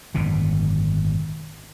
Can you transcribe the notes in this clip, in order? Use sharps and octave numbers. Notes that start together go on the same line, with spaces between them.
G#1 F#2 B2 D3